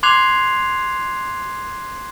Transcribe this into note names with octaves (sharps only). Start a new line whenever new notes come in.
C6 D6 F#6 G#6 C7 F7